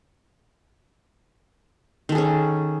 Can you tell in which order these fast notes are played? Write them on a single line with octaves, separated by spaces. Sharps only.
D#3 A4 G#4 C#4